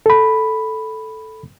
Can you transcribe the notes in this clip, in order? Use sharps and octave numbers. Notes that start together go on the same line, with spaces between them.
A4 B5